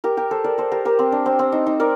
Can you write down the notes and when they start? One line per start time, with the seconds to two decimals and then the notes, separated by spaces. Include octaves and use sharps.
0.04 G4 A#4
0.17 G4 A#4
0.31 A4 C5
0.44 A#4 D5
0.58 A4 C5
0.72 G4 A#4
0.85 G4 A#4
0.99 C4
1.12 D4
1.26 C4
1.39 C4
1.52 D#4
1.66 D#4
1.80 A#4 D5